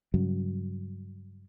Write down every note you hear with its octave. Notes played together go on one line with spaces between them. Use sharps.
G2 C#3 F#3